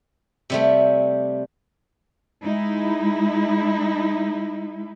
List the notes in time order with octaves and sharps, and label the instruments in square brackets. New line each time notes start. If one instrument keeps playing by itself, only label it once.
[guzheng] C3 G3 A3
[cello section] G#3 D#4 E4